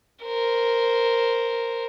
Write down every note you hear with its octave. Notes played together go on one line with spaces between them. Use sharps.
A#4 C5